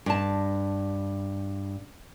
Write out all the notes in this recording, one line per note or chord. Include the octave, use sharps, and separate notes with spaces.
G2 A5